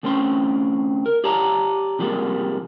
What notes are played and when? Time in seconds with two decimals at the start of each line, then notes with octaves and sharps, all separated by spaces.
0.03 D2 A3 C4 C#4 C6
1.06 A#4
1.24 G4 C#5 D5 A5 A#5
1.99 C3 F3 G3 G#3 A#3